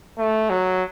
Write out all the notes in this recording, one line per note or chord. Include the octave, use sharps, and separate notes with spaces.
A3
F#3